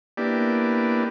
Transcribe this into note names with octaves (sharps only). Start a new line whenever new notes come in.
A#3 B3 D4 E4 G4 D5